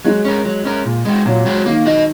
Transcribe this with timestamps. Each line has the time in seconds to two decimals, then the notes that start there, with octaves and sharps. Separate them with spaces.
0.05 F#3 G#3
0.25 C#4 A#4
0.45 F#3
0.65 C#4 A#4
0.85 A#2
1.05 G#3 F#4
1.26 A#2 F#3
1.46 G#3 F#4
1.66 D#3 A#3
1.86 F#4 D#5